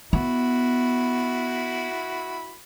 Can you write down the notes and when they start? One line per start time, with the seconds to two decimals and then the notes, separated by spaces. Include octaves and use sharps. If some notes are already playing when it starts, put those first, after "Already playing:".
0.13 B3 E4 F#4 B5